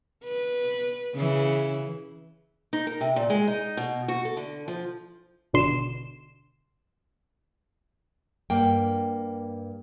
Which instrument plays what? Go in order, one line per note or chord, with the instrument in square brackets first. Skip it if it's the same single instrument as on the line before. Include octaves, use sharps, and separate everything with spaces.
[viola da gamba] B4
C#3 E3
[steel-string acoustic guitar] D#4
A#4
C3
A#2
G#3
D#4
B2
F#4
A4
D3
F3
[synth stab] G#1 B2 D3 C6 E7
[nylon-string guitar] G2 A#3 G5